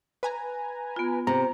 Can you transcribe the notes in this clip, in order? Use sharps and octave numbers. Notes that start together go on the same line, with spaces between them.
B4 G#5 A#5
B3 F4
C3 A#5